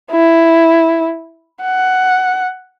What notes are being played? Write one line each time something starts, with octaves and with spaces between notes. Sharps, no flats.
E4
F#5